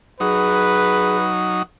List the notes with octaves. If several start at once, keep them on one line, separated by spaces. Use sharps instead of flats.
F#3 D#4 G#4 B4